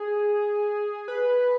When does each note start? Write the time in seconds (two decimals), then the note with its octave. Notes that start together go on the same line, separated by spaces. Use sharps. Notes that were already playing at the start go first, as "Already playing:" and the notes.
Already playing: G#4
1.08 B4